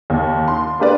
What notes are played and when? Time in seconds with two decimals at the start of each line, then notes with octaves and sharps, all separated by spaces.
0.10 D#2
0.48 C6
0.80 A#3 D4 G4 B4 D5